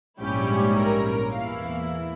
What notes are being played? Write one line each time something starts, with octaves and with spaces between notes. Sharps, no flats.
A#1 G#2 G3 C#4 E4 G4
A#4
E2 E3 A#3 E4 F5